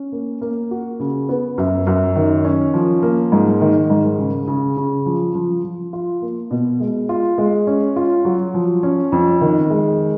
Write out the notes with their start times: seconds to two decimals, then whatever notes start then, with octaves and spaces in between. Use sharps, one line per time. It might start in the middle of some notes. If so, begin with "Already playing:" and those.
Already playing: C#4
0.12 A#3
0.41 A#3
0.71 F#4
1.00 C#3
1.29 B3
1.58 F#2
1.87 F#2
2.16 D#3
2.45 C#4
2.74 F3
3.03 A#3
3.32 G#2
3.61 D#3
3.90 G#2
4.19 C#3
4.47 C#3
4.77 C#3
5.06 F3
5.35 F3
5.64 F3
5.93 F4
6.22 A#3
6.51 B2
6.80 G#3
7.09 F4
7.38 G#3
7.67 C#4
7.96 F4
8.25 F#3
8.54 F3
8.83 C#4
9.12 F2
9.41 D#3
9.70 G#3